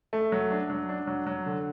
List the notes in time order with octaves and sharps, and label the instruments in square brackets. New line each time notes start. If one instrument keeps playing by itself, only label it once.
[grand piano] A3
F#3
D4
F#3
D4
F#3
F#3
D3